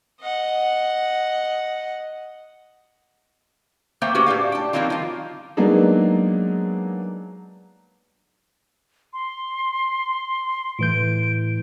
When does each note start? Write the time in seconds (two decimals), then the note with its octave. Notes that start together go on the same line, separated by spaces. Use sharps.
0.21 D#5 F#5
4.02 A3 A#3 C5 E5 G5
4.15 C#4 F#4 G4 B4
4.26 A2 D4 G4 F5
4.52 G5 A5
4.73 E3 F#3 A#3 C4 D#4 F4
4.90 D#3 F4
5.57 F#3 G#3 A#3 B3 D4 D#4
9.13 C6
10.79 A2 E3 G6 D7